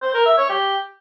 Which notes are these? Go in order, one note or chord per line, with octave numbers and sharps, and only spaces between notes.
C5
A#4
E5
C#5
G4